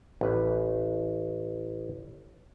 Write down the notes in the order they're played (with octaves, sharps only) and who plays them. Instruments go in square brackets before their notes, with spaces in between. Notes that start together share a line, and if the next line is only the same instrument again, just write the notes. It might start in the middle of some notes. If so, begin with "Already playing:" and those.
[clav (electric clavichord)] A1 B4